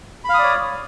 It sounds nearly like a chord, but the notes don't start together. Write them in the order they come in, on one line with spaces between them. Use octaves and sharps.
B5 F5 D#6 D5 C#5